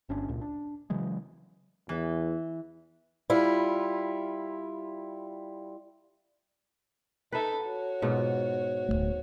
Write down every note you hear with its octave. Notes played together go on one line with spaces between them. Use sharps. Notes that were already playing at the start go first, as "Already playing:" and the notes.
G1 C#4 D4
C#2 A#2
D4
C#3 E3 F#3 G#3
E2 E3
G3 E4 F4
D#4 A4 B4 E5
F#4 C#5
G#2 B2 F4
D1 E2 A3